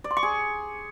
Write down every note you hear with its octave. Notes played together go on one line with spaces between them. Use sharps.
D5
C6
C#6
G#4